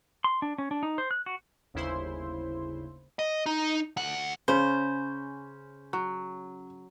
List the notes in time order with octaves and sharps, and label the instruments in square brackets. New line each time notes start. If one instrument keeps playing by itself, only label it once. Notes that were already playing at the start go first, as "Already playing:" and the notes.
[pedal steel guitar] C6
D4
C#4
D4
D#4
C5
F#6
F#4
[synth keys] G1 D#2 C#3 E4 C5 C6
[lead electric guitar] D#5
D#4
D2 F#5
[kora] C#3 [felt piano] C#4 [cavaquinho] C5
[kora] F#3